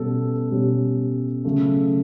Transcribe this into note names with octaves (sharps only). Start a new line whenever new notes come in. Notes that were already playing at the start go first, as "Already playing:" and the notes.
Already playing: B2 G3 C#4 A4
B2 G3 C#4
C#3 F#3 A3